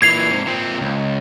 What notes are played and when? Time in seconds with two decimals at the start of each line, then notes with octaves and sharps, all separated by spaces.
0.02 A#2 E3 G#6 C7 F7
0.30 G#2 C3
0.46 A#2 C4
0.81 C#2